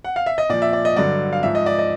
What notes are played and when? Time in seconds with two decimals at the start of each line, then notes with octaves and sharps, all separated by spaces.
0.05 F#5
0.16 F5
0.26 E5
0.38 D#5
0.49 A#2 F3 D5
0.62 E5
0.73 D5
0.85 D#5
0.96 G2 D3 F#3 D5
1.33 F5
1.43 G#2 F3 E5
1.55 D#5
1.66 D5
1.79 D#5